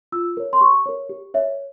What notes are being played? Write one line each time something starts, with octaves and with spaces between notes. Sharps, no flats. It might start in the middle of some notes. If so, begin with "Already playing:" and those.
F4 E6
A#4 C#5
C6
G4 C#6
A#4 C#5
G4
A#4 C#5 E5